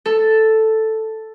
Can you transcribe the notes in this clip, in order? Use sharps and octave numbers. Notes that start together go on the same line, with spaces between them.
A4